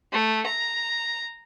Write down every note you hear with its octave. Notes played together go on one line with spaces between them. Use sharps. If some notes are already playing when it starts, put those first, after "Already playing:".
A3
A#5